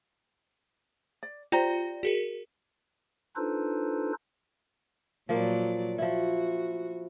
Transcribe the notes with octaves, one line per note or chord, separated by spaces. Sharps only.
D5
F4 G4 C5 D5 A#5
F#4 G#4 A#4
D4 D#4 F4 A4 B4 C5
A#2 F3 F#3 A#3 D5
F3 E4 F#4